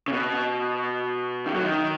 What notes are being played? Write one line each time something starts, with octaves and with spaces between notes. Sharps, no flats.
C#3
B2
D#3
F#3
D#3